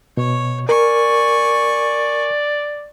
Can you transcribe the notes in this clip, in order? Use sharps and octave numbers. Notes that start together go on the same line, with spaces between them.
B2 C#5
A#4 D5 G#5 C#6